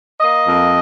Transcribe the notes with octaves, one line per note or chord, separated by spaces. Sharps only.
A#3 D#5
F2